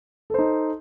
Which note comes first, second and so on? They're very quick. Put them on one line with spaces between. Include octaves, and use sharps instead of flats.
A4 C5 D#4